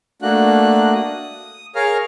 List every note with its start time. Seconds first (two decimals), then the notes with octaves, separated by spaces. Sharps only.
0.22 A3 A#3 D4 F#4 F#6
0.95 D#6
1.75 G#4 A#4 C#5 F5 A#5 F6